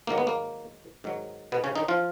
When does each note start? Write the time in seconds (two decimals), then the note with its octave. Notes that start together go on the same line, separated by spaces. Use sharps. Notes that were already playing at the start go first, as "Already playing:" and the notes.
0.07 G#2 D#3 F#3 A#3
0.18 B3
0.27 A#3
1.04 G#2 D#3 F#3
1.52 B2 B3
1.64 C#3 C#4
1.76 D#3 D#4
1.88 F3 F4